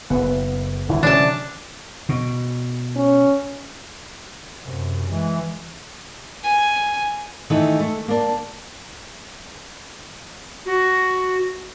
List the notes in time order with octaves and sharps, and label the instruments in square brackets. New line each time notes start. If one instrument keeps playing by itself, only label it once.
[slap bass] F#1 [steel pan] B3
[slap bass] G#1 G3 [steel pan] D3 E4
[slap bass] C3 E3 F#3 [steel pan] C#4 [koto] D4 A5
[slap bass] B2
[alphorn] C#4
[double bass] F#2 C3
E3 G#3
[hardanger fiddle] G#5
[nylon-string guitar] D#3 E3 A3
A3
A#3 D4
[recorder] F#4